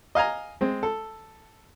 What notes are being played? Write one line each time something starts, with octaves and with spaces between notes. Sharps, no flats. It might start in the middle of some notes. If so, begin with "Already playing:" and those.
D#5 F5 G#5 A#5
G#3 C4
A4